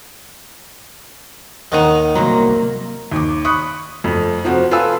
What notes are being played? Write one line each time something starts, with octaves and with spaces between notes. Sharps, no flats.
D#2 D#3 D#4 D#5 F#5
C2 F#3 A#3 C5 A#5
D#2 D6
B5 C#6 D#6 F#6
F2 A3
C3 F3 C4 F#4
F4 A4 B4 G#5 E6